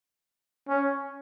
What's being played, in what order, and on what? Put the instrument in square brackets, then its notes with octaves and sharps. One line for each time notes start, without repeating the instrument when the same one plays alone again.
[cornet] C#4